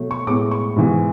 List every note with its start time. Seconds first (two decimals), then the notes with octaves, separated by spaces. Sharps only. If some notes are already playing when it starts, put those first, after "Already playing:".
Already playing: B2 F#3 A3
0.11 C#6
0.27 A2 G#3 B3 D6
0.51 C#6
0.76 G#2 E3 B3